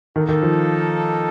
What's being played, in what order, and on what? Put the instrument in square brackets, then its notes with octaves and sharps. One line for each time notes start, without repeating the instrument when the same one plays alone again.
[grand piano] D#3 [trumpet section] A#3 D#4 A4
[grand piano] D#3
F3